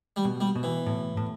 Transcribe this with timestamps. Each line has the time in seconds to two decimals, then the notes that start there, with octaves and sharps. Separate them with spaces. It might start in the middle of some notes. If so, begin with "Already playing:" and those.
0.16 G3
0.25 B2
0.41 G3
0.56 B2
0.63 E3
0.86 A2
1.17 A2